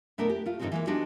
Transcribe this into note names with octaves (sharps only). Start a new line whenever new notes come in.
B2 A3 B3 D4 A#4
G4
A3 F4
G#2 D3 D#3 F3 G#3 C4
E3 G#3 A#3
G#3 B3 D4 D#4 F#4 G4